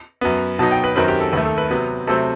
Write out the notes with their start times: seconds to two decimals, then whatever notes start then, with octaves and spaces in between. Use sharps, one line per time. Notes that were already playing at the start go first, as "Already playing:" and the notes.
0.21 F#2 F#3 B3
0.59 B2 F#3 B3 D#4 A5
0.71 G5
0.84 B4
0.96 F#2 D#3 F#3 C4 B4
1.08 G4
1.20 A4
1.33 D#2 D#3 A3 B4
1.45 A4
1.58 B4
1.70 C3 F#3 B3
2.07 C3 F#3 A3 C4 A4